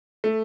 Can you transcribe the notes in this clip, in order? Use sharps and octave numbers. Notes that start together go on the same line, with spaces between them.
A3